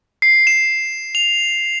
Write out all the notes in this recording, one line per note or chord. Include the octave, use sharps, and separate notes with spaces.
C7
E7
F7